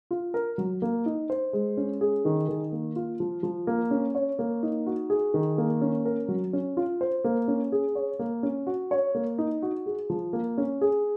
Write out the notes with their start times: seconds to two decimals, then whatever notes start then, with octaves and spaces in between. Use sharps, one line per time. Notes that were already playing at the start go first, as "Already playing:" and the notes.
0.11 F4
0.34 A#4
0.58 F#3
0.82 A#3
1.06 D#4
1.30 C5
1.53 G#3
1.77 C#4
2.01 G#4
2.25 D#3
2.48 D#3
2.72 A#3
2.96 F4
3.20 F3
3.43 F3
3.67 A#3
3.91 C#4
4.15 C#5
4.39 A#3
4.63 D#4
4.86 F#4
5.10 G#4
5.34 D#3
5.58 A#3
5.81 C#4
6.05 A#4
6.28 F#3
6.53 C#4
6.77 F4
7.01 C5
7.24 A#3
7.48 C#4
7.72 G#4
7.95 C#5
8.19 A#3
8.43 C#4
8.67 F#4
8.91 C#5
9.15 A#3
9.38 D#4
9.62 F#4
9.86 G#4
10.10 F3
10.33 A#3
10.58 C#4
10.81 G#4